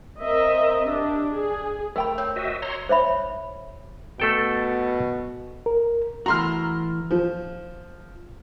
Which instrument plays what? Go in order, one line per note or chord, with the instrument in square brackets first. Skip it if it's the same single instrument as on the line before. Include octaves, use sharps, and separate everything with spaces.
[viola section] C4 A#4 D#5 E5
D4 G4
G#4
[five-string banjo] A3 G5 [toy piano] A#4 B5
[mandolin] C4 [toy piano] C#5
[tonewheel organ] F#4 D#5 E5
C#5 A#5 C6
[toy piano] C5 C#5 E5 B5
[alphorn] B2 [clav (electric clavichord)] A3 A4 G5
[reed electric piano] A#4
[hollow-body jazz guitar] E3 A3 F#4 [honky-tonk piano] A#5 C6 F6
[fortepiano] F3